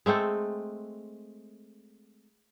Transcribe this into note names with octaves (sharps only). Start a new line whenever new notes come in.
G#3 A3 C4 A4